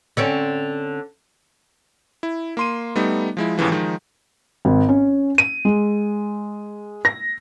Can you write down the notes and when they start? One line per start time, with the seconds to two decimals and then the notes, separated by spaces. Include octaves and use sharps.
0.17 D3 C4 C#4
2.23 E4
2.57 A#3 C6 D#7
2.96 G3 A3 B3 D#4
3.37 F3 G#3 E4
3.57 D#2 A2 C#3 E3 F3
3.72 D#3 F3 G#3 D#4
4.65 G#1
4.89 C#4
5.38 D#7
5.65 G#3
7.05 A#6